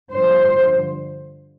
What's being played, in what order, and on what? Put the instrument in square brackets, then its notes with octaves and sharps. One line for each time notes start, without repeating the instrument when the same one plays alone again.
[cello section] G2 D3 F3 C5